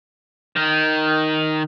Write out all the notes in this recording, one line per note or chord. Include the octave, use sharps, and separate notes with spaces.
D#3